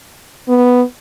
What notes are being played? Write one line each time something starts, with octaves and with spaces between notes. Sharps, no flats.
B3